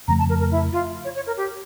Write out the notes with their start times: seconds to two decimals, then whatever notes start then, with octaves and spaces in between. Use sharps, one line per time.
0.08 F2 C#3 F3 A3 A#5
0.19 A5
0.29 A#4
0.40 A#4
0.51 E4
0.72 F4
1.05 C#5
1.16 C#5
1.27 A#4
1.37 G4